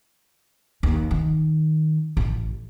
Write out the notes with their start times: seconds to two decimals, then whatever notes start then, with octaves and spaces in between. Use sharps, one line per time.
0.83 D#2
1.11 D#3
2.17 A1